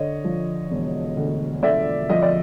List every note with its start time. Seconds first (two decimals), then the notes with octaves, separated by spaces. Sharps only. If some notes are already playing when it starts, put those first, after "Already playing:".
Already playing: D3 C#5 D#5
0.24 F3
0.71 E1
1.17 D2
1.63 D3 D5 E5
2.10 F3 D#5
2.23 D5